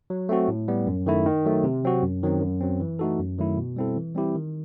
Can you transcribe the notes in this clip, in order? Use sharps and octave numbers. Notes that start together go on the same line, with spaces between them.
F#3
A3 C4 F#4
A2
G3 B3
F#2
D#3 A3 E4
D#3
F#3 A3
C3
F#3 C4 F#4
F#2
D#3 F#3 C4
F#2
F#3 C4
E3
A3 D#4 F#4 A4
F#2
D#3 F#3 A3 E4
B2
G3 C4 E4 A4
E3
G3 C4 E4 G4
D#3